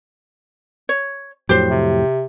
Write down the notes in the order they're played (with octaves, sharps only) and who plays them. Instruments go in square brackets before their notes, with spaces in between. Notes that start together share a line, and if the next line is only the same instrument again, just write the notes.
[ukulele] C#5
[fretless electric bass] F2 A2 F#3 [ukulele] G4 C5
[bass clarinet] C3